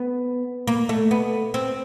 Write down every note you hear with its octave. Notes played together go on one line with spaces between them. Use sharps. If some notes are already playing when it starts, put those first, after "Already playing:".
Already playing: B3
A#3
A3
B3
C4